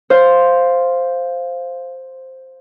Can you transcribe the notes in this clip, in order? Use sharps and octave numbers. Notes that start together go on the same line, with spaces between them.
C5 F5